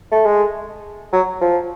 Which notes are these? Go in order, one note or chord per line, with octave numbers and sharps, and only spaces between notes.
A3
G#3
F#3
F3